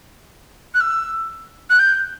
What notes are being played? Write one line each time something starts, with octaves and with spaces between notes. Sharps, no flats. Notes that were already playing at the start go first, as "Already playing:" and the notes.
F#6
E6
F#6
G6